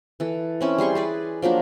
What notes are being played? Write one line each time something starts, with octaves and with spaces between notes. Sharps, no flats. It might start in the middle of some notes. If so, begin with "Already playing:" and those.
E3 A4
C4 C#4 E4
G3 G#4 C6 C#6
G#4 B4 D5
F3 F#3 A#3 D4